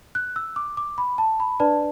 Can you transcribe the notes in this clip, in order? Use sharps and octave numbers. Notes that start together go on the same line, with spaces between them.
F#6
E6
D6
D6
B5
A5
B5
D4 B4 D5 A5